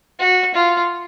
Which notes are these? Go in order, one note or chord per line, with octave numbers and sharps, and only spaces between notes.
F#4
F4